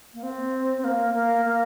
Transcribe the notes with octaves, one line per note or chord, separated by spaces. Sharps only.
A#3
C4
C4
A#3
A#3
A#3